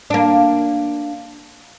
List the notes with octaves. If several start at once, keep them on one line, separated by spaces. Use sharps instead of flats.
A#3 D4